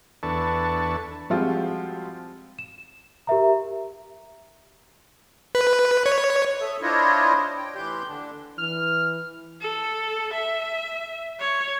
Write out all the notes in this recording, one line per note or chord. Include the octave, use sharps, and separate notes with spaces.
E2 D4 A4 B4 A5 C#6
F3 G3 G#3 C4 F4 F#4
E7
G4 A#4 E5 A#5
B4
C#5
A4 E5 D#6
D4 E4 F4 C5 C#5 D#5
G5
A2 E3 G4 C6 G6
D3 D4
E3 F6
A4
E5
C#5